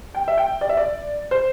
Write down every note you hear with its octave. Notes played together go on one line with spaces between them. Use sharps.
G5
E5
G5
D5
E5
D5
C5